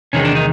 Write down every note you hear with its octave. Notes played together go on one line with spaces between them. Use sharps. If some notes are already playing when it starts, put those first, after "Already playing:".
E2 C3 D#3 G#3 C#4
D4
D#4